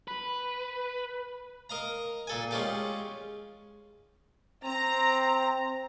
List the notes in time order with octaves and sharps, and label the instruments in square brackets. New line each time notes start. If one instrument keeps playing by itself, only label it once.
[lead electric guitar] B4
[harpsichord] A#4 D#5 F5 A#5
A#2 A4 G#5
G#3 C#4 F4 G4
[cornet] C4 [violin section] A#5